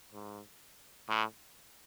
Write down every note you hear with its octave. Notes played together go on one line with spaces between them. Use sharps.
G#2
A2